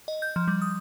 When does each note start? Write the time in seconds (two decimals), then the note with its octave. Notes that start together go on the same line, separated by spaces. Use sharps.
0.08 D#5
0.22 G6
0.36 F3
0.48 G3
0.62 D#6